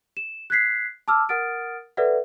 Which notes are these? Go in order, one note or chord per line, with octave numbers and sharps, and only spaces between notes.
E7
F#6 G#6 B6 C7
A5 D6 E6 F6
A#4 F#5 D#6 F6 A6 D7
A4 B4 D5 E5 F#5